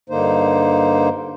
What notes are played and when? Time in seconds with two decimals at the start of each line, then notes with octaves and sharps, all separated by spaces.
0.09 G2 D3 A#3 D#4 C5